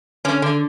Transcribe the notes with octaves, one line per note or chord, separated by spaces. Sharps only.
D3 C#4
D3